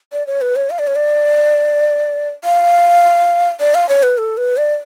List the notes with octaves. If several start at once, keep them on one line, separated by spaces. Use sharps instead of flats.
D5
C#5
B4
C#5
F5
D5
C#5
D5
F5
D5
F5
C#5
B4
A4
B4
D5